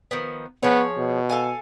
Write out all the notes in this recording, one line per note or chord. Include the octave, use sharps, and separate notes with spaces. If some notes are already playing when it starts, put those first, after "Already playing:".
D#3 F3 B3
F3 B3 G#4 C#5
B2
A4 F5 G#5